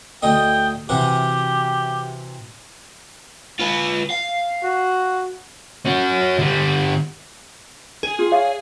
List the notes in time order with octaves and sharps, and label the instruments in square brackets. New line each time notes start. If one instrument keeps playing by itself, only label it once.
[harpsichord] D2 A3 D#5 [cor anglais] G5
[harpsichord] C3 E3 F#4 [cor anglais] G4
[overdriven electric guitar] F4 B4
F5
[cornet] F#4
[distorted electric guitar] C#4 F#4
D3 G3
[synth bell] G#4
[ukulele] F4
C#5 D5 F5